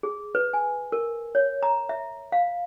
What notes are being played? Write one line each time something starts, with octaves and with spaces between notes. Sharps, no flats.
G#4
B4
G#5
A#4
C#5
A#5
E5
F5